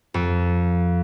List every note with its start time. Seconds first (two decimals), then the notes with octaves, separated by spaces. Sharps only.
0.14 F2